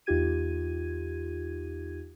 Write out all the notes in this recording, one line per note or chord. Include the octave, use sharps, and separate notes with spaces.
E2 D#4 F4 G4 G#6 D#7